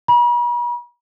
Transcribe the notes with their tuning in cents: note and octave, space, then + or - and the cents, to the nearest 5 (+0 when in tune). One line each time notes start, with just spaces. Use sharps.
B5 -45